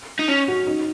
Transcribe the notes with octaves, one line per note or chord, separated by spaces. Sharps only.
D#4
C#4
F#4
D#4